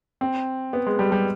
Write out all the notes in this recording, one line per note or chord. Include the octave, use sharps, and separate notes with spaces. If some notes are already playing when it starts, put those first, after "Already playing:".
C4
B3
G#3
G3
G3